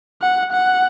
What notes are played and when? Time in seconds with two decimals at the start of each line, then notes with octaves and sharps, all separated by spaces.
0.22 F#5
0.52 F#5